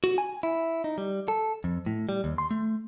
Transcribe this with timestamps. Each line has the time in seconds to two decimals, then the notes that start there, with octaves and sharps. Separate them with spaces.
0.04 F#4
0.18 G#5
0.43 E4
0.84 D#4
0.98 G3
1.28 A4
1.64 F2
1.86 A2
2.09 G3
2.24 D#2
2.38 C6
2.51 A3